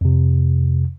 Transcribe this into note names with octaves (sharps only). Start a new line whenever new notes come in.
F2 C3